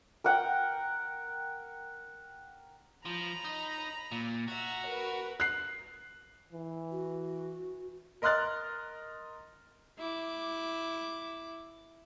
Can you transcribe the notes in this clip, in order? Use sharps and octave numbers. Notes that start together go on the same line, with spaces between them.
A#4 F#5 G5
F3 A#5 B5
D#4
A#2
F#4 E5 A#5
A#4 B4
F#6 C7
E3
F#4
A#4 D#5 C6 F6 F#6 A6
E4 D6